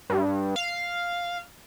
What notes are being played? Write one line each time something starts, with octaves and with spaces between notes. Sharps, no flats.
G2
F5